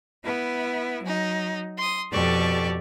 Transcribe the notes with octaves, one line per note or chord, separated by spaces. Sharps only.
B3 E4
F#3 D#4
C6 D#6
F2 B2 G4 A4 D5 C#6